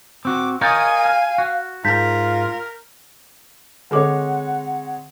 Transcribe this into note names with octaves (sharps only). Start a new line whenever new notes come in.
C4 F#4 D6
A#4 C#5 D#5 F5 G#5 D#6 G6 A6
F6
F#4
G#2 F4 A#4 G6 B6
D3 G#3 C4 A4 C#5 F#5 D6